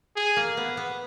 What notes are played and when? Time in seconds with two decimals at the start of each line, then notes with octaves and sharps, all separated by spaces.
0.16 G#4
0.36 A#3
0.57 B3
0.77 B3